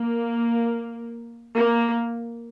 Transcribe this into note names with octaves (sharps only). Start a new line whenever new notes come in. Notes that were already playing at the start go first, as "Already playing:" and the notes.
Already playing: A#3
A#3